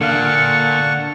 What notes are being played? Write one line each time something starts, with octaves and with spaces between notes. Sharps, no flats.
A#2 D3 F5 F#5 A5 C#6 C#7